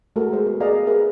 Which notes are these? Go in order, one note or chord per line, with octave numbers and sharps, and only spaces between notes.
G#3 A3 F#4 A4 A#4
G#4 C5
B3
G#4 A#4 D5 D#5 F5 A#5
G#4 A#4 B4 E5